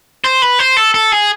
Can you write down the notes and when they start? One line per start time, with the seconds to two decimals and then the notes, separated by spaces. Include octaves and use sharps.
0.24 C5
0.42 B4
0.59 C5
0.77 A4
0.94 A4
1.12 G#4